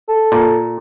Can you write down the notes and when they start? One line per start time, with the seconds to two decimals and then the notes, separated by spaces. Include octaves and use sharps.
0.08 A4
0.32 A#2